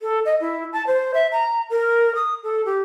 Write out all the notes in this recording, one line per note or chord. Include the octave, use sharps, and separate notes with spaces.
A4
D#5
E4
A5
C5
E5
A#5
A#4
D#6
A4
G4